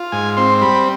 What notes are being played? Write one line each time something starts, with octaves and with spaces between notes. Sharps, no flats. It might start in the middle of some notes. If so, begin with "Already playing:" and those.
Already playing: F4
G#2 G#5
C4 C6
G3 B5